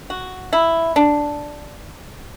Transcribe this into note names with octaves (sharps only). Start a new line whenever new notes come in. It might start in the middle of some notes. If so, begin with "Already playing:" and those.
F#4
E4
D4